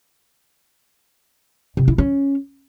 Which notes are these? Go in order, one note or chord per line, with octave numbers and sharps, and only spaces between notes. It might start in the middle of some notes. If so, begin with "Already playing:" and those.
C3
E4
C#4